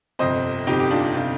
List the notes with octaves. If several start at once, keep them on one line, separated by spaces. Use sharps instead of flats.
G1 F2 C3 C5 D#5
G1 F2 C3 D#4 G4
G4
D4 F4
C3 D4 F4